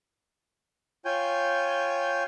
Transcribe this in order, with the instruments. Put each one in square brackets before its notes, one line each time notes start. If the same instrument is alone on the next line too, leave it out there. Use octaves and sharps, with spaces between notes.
[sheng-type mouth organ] F4 C#5 G5 G#5 G6